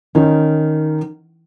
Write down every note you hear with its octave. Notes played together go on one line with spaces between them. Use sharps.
D#3 C#4 D#4